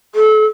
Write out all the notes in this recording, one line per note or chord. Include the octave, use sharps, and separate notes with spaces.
A4